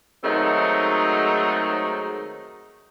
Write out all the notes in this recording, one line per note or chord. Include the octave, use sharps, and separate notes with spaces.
D#3 F#3 G#3 A3 C4 D#4